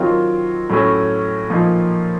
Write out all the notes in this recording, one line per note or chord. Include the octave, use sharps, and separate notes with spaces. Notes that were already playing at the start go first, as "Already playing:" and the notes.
Already playing: D#3 F#3 C4 F4
A2 F#3 A3 C#4
A#2 F3 A#3 D#4